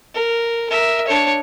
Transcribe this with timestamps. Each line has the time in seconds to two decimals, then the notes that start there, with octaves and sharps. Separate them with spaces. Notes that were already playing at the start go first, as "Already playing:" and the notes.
0.15 A#4
0.69 A#4 E5
1.07 D4 C#5